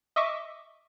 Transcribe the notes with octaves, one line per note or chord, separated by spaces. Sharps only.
D#5 E5 C#6 D6